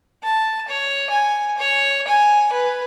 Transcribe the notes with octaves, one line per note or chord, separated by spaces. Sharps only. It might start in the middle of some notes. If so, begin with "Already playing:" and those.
A5
C#5
G#5
C#5
G#5
B4